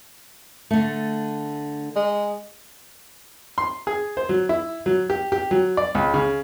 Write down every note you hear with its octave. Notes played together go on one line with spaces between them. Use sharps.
D3 A3
G#3
C6
G#4
C5
F#3
E4
F#3
G4
G4
F#3
D5
C#2
C#3